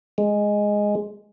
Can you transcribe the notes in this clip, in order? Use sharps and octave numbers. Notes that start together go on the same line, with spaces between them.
G#3